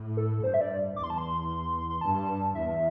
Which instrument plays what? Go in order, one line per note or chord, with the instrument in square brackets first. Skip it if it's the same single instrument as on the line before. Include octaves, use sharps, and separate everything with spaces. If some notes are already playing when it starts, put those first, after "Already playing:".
Already playing: [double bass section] A2
[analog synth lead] A4
[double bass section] G2 [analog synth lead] C5
[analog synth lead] E5
D5
[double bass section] E2 [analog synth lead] D6
[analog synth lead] C6
A5
C6
C6
[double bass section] G2 [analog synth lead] A5
[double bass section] E2 [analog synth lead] E5